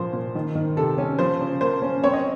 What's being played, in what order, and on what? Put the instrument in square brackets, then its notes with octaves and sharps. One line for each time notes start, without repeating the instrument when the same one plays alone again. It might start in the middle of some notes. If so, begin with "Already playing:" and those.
Already playing: [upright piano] A#2 F3 C5
A#2
D#3
D#3
C3 A4
C#4
F3 C5
C#3
A#3 C5
C#4
C4 C#5
D#5